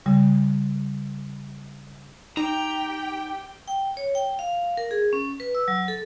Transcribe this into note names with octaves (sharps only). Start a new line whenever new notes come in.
C#3 G3
D#4 G4 G5 A#5
G5
C#5
G5
F5
A#4
G#4
C#4
B4
E6
F#3
A4